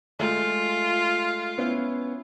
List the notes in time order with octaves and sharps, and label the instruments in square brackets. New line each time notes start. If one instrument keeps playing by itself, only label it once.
[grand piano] G#3 A3 [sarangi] F4
[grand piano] B3 C#4 E4